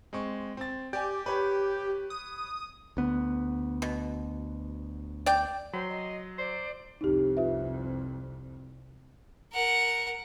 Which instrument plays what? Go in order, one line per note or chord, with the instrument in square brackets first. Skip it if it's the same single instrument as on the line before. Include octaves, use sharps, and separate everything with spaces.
[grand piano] G#3 C4 C#6
C4 A6
[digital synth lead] G4 [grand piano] D5 G#5
[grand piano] B4 C#5 B5
[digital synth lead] D#6
[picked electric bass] D2 B3
[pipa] B2
D5 G5
[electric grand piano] F#3 [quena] C5 [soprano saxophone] C6
[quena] D#5
[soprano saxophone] C5 [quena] D5
[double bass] C2 F2 [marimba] D#4 G4
[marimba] F4 B4 E5
[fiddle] A#4 F#5